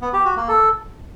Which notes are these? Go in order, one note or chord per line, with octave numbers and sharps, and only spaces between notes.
B3
G4
F#4
A#3
A4